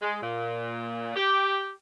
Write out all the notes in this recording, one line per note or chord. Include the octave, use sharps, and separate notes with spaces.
G#3
A#2
G4